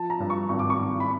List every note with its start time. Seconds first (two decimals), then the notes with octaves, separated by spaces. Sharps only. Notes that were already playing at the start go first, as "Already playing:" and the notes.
Already playing: F3 A5
0.10 A#5
0.20 G2
0.30 C#6
0.49 G#1 C#6
0.59 D6
0.70 C#6
0.79 G#1
1.00 B5